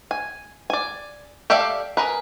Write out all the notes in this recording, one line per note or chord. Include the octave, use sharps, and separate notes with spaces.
G#5
D5 G#5
G4 A4 D5 E5 F5
G#4 A#4 B4